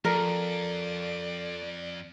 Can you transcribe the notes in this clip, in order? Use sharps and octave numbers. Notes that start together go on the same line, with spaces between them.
F2 F3 A4 A#4 D5